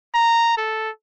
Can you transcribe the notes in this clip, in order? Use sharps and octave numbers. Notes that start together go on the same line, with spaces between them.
A#5
A4